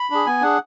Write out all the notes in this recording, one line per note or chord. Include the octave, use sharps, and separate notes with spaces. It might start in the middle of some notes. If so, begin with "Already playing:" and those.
Already playing: B5
D4 G#4
B3 G#5
D4 G#4 F#5